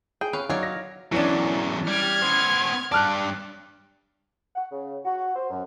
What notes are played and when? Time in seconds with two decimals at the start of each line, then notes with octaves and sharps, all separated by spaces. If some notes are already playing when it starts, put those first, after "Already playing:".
0.21 G#4 G5
0.33 C#4 B4 F5
0.50 F#3 D#4 F#4 A#4 C#5 D5 F5
0.63 A#6
1.12 E2 E3 F#3 C#4 D4
1.87 G3 F6 G#6
2.22 B3 C5
2.92 G2 D5 A5 F6 F#6
4.56 F#5
4.72 C#3
5.05 F#4
5.36 C5
5.50 F#2